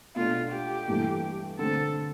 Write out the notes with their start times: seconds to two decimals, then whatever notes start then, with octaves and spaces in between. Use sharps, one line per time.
0.16 B2 A3 D4 F4
0.52 G4
0.88 G2 E3 A3
1.59 D3 A3 C4 A4